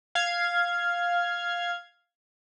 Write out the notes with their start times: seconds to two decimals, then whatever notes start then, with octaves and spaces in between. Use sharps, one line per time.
0.15 F5 G#6